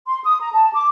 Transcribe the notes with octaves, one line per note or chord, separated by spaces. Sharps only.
C6
D#6
A#5
A5
D6